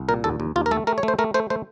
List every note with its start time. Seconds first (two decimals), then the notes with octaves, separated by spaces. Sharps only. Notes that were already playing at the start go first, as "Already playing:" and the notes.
Already playing: C2
0.09 A#2 A#4
0.24 D#2 A4
0.40 D#2
0.56 D#2 F4
0.66 A#4
0.71 A3 A4
0.87 A3 A#4
0.98 C#5
1.03 A3
1.08 C5
1.19 A3 A#4
1.34 A3 C5
1.50 A3 C5